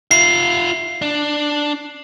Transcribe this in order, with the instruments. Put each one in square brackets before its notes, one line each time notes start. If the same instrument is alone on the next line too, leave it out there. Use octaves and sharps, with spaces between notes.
[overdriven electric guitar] F4 E5 [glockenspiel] C7
[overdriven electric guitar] D4